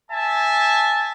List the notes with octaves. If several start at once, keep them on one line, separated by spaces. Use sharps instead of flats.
E5 G#5 A5